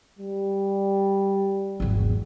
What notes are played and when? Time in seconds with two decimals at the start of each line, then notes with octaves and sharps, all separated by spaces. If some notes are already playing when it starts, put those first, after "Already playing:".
0.19 G3
1.80 G#1 E2